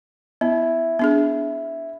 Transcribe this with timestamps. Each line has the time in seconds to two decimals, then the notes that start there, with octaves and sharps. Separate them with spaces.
0.41 B3 E4
0.99 B3 D4 G#4